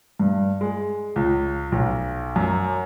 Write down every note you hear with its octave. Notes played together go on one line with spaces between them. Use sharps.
G2
G#3
C#2
B1
F#2